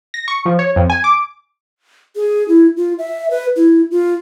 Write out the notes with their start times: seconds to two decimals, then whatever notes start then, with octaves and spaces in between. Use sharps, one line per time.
0.14 A#6
0.28 C#6
0.46 F3
0.59 C#5
0.76 F2
0.90 G#5
1.04 D6
2.16 G#4
2.48 E4
2.77 F4
2.99 E5
3.31 B4
3.56 E4
3.91 F4